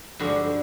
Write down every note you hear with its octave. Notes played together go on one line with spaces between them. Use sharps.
G2 D3 F3 G#3 F#4